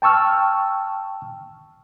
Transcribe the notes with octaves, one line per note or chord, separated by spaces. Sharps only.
G5 A5 C#6 E6 F6